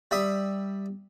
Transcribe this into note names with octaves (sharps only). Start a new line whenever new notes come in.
G3 E5 D#6